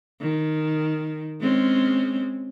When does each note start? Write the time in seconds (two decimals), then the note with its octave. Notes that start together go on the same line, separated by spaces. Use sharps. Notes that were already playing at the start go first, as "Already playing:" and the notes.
0.21 D#3
1.41 G#3 C4 C#4